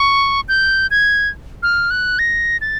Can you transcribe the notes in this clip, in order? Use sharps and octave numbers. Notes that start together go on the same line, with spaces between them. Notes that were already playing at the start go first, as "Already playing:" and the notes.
Already playing: C#6
G6
G#6
F6
F#6
A#6
A6